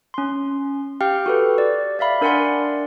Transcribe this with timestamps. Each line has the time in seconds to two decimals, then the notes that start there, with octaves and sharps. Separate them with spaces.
0.14 C#4 C6
1.01 G4 F5 G5 F6
1.26 F#4 A4 B4
1.58 D5
1.99 D5 E5 F5 B5
2.21 D4 A#4 D5 F#5 G#5 C6